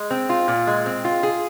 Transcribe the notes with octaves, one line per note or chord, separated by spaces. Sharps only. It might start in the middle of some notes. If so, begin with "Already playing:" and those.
Already playing: G#3
C4
F4
A#2
G#3
C4
F4
G#4